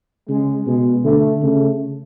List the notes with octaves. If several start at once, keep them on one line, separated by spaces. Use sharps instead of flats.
C#3 G#3
B2 G#3
D3 A3
C#3 A3